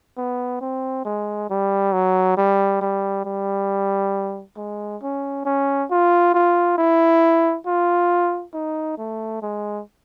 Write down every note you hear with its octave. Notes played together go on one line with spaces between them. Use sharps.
B3
C4
G#3
G3
F#3
G3
G3
G3
G#3
C#4
C#4
F4
F4
E4
F4
D#4
A3
G#3